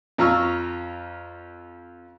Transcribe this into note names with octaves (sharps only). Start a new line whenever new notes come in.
F2 F4 A#5 C#6 E6 F6